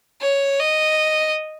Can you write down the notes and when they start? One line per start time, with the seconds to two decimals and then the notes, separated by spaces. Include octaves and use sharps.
0.21 C#5
0.60 D#5